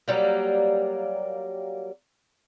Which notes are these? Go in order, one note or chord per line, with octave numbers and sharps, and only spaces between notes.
F#3 G3 A#3